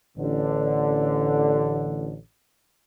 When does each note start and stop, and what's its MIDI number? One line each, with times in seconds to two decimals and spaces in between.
0.18 2.16 33
0.18 2.16 50